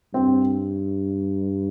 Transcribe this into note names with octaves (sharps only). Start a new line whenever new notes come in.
G2 C4